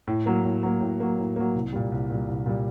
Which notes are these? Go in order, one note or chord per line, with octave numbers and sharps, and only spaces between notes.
A2
F#3 A#3
A2
F#3 A#3
A2
F#3 A#3
A2
F#3 A#3
C2
A#2 G3
C2
A#2 G3
C2
A#2 G3